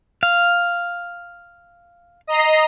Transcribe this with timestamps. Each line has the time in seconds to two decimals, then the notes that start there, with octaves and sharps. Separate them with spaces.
0.23 F5
2.27 D#5 A#5 C7